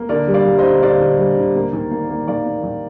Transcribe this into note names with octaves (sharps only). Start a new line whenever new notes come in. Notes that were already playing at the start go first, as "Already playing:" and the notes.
Already playing: A#3
D3 A#4 D5
G3
D5 F5
G3
C5 D#5
D3
D3 D5 F5
D3
G3
D3
A#3
D#3
A#3
A#3
D#3 D5 F5
A#3
D#3